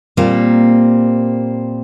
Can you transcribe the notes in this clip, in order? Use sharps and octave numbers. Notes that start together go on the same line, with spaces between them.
A#2 G3 A#3 C4